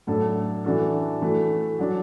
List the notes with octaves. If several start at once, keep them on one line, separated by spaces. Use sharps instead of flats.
A2 F#3 D4 A4
E3 D4 F#4 A4
E3 A3 F#4
F#3 D4 F#4